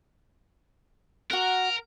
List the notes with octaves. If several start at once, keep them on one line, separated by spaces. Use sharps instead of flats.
F#4 A#4 F#5